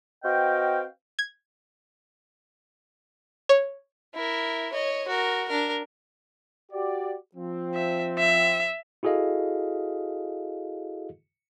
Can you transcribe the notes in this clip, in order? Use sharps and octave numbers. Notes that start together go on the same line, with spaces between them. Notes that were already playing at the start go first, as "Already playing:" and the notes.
C4 F#4 B4 D#5 F5 G5
G#6
C#5
E4 A#4
C#5 D#5
F#4 A#4
D4 A#4
F#4 G4 D5
F3 C4
E5
E5
E4 F#4 G#4 A4 D#5 F5